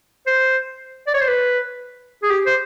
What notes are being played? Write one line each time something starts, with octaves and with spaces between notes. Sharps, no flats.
C5
D5
C#5
C5
B4
G#4
G4
C5